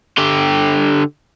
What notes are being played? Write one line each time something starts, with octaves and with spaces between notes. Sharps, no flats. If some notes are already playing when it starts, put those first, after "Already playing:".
D3 G4